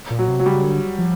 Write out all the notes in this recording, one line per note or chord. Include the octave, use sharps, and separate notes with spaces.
A#2
F#3
C3
F#3
C#3 G3
D3
F3